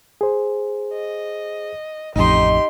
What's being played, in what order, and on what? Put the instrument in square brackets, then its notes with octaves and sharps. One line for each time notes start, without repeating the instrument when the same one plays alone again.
[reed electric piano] G#4 C5
[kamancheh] D#5
[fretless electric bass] A1 F2 [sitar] D#4 [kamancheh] G4 C6